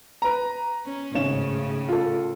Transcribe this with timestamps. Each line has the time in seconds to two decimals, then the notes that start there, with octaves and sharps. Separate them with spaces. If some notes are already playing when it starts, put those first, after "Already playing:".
0.22 B4 A#5
0.85 C#4
1.14 G#1 A2 C#3 C#4 E7
1.88 F4 A4